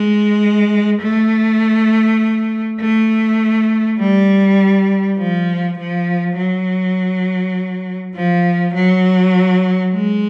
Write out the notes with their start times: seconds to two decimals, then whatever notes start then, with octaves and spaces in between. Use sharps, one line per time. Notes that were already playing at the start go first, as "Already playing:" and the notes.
Already playing: G#3
1.02 A3
2.80 A3
3.99 G3
5.18 F3
5.78 F3
6.37 F#3
8.15 F3
8.74 F#3
9.93 G#3